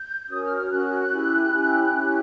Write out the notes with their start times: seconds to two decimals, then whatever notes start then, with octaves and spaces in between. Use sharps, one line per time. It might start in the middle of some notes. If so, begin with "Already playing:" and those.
Already playing: G6
0.29 C#4 F#4 A#4 C#5 D#6
0.43 F6
0.57 F6
0.70 C#4 F#4 A#4 C#5 F#6
1.10 C#4 E4 G4
1.52 C#4 E4 G4
1.92 C#4 E4 G4